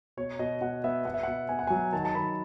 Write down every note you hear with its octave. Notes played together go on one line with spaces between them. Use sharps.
B2 C#5
B2 D#5
B2 F#5
B3 E5
B3 F#5
E5
B2 F#5
B3 G#5
F#5
F#3 G#5
D#3 A5
A5
D#3 B5